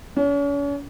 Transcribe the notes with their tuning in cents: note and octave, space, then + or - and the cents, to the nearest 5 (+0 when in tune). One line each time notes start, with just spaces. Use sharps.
C#4 +40